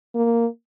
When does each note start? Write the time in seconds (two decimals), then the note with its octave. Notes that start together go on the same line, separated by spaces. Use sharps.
0.15 A#3